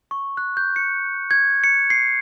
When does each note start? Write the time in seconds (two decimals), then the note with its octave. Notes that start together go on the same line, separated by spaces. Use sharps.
0.11 C#6
0.37 F#6
0.57 G6
0.76 C#7
1.31 G#6
1.64 C#7
1.90 C7